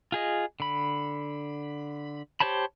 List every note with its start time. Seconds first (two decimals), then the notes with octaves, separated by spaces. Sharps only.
0.12 F4 G#4 D#5
0.60 D3 B5
2.40 G4 C5 C#5 A5 B5